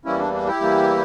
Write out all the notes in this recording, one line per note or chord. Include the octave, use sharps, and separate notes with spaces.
E2 E3 G3 A#3 C#4 E4
D4
D4
E4 G4
E2 E3 G3 A#3